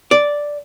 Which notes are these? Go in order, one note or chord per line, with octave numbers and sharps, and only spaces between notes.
D5